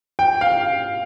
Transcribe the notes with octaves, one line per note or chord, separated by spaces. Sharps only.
G5
F5